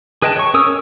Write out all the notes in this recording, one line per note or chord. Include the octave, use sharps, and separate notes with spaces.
G#4 B4 D#5 G5 A5
C#5 C#6
C#4 A#4 D#6 E6
C#5